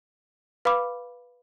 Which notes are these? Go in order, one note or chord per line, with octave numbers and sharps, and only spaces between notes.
B4 F5 B5 D6